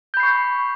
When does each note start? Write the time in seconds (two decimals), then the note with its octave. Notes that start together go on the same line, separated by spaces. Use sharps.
0.14 G6
0.17 B5
0.20 C7
0.23 C#6